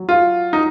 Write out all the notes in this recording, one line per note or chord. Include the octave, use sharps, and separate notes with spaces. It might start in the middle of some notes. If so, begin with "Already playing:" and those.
Already playing: F#3
F4
D#4